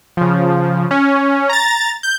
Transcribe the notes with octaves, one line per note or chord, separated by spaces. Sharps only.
C#3 F3
C#4
A#5 A6
G6